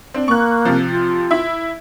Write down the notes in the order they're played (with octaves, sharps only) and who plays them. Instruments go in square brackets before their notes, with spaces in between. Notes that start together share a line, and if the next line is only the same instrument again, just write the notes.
[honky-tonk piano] C4 D4
[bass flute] A#3 [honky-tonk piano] C#6 F#6
[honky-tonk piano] C3 F3
[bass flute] F4
[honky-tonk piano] E4 E5